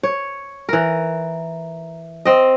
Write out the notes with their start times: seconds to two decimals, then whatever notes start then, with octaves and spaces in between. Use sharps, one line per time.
0.03 C#5
0.69 E3 A#4
2.25 C4 D#5